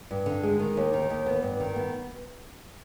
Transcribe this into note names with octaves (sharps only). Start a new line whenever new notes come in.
G2
D3
G#3
D#3
D#2
D#3
D#2
B3
G2
D#3
B3